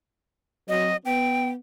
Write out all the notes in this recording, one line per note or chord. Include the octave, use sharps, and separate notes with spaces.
F#3 C4 D#5
B3 G5